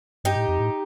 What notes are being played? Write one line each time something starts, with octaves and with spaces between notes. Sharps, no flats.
G2 D#4 G4
A2
F2
A2